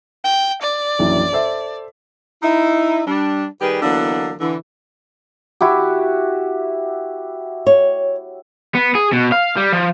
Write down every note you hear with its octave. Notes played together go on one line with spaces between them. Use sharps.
G5
D5
A#1 F#2 E3
A4 C5 E5
D#4 E4
G3 D4
D#3 G3 G4 G#4 B4
D3 E3 F#3 A#3 B3 D4
D3 E3
E4 F#4 G4
C#5
B3
G#4
B2
F5
G3
F3